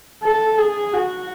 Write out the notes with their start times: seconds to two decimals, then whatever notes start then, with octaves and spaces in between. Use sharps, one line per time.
0.24 A4
0.58 G#4
0.93 F#4